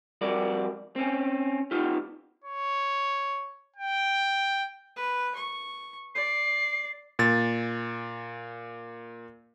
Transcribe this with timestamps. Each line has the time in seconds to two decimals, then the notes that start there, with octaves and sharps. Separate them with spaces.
0.21 F2 G3 F#4 A#4 D5
0.96 C4 C#4
1.71 B3 D#4 F4 G4
2.44 C#5
3.76 G5
4.96 B4
5.35 C#6
6.15 D5 C7
7.19 A#2 A6